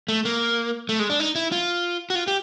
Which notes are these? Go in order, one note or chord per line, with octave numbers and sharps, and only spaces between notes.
A3
A#3
A3
G#3
D4
D#4
E4
F4
F#4
F4
G4